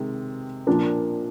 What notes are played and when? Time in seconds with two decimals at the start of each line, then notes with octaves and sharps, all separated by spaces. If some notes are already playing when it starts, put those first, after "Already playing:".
Already playing: C3 D#3 G#3
0.67 A#2 F3 A#3 D4